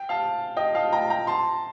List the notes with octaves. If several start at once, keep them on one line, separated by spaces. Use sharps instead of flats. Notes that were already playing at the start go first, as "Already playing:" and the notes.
Already playing: G5
F5 A5
D#5 G5
F5 A5
G5 A#5
G5 A#5
A5 C6